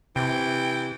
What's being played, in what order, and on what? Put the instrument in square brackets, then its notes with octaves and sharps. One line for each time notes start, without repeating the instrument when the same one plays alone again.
[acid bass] C3 [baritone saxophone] E3 [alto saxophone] G5